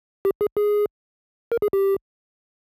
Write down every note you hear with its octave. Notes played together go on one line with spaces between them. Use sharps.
G4
G#4
G#4
A#4
G#4
G4